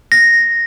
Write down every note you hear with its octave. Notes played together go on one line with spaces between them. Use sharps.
A#6